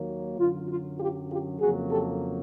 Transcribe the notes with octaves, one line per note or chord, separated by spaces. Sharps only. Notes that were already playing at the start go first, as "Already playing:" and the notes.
Already playing: D#2 D#3 F#3 A#3
F#2 D3 F#3 F4
F4
F4 G4
F4 G4
F2 C#3 F#3 A#3 F#4 G#4
G4 A4